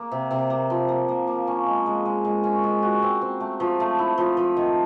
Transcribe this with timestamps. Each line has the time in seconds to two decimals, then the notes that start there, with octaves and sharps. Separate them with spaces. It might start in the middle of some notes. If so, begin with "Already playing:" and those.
Already playing: A#3
0.11 C3
0.31 C3
0.50 A#3
0.70 F3
0.88 A#3
1.09 A#3
1.27 A#3
1.47 C#4
1.66 G#3
1.86 G#3
2.05 G#3
2.25 G#3
2.44 C#4
2.64 G#3
2.82 F#4
3.02 C4
3.21 C4
3.40 A3
3.60 F3
3.80 A3
3.99 E4
4.18 F3
4.37 F3
4.57 D#3